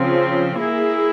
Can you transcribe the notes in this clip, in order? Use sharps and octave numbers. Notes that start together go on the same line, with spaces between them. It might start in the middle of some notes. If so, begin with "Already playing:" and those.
Already playing: C#3 F3 C4
A#3 E4 G#4